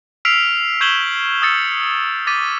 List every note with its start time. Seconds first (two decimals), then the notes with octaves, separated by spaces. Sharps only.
0.25 E6 F6 B6 C7 D7 F7
0.81 C#6 G6 G#6 E7 F#7 G7
1.42 D#6 E6 A6 C#7
2.27 D6 A6 B6 D#7